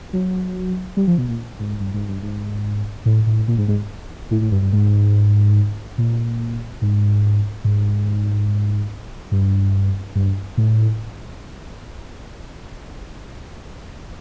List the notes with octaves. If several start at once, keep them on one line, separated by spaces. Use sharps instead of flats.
F#3
G3
F3
B2
A#2
G#2
G2
G#2
G2
G#2
A2
A2
A#2
G#2
G#2
A2
A2
G2
G2
G#2
A#2
G#2
G#2
G2
G2
A2